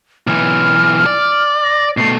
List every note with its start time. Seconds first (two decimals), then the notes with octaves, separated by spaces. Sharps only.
0.27 B1 E3 F6
1.06 D5
1.64 A#6
1.97 B2 A3 C7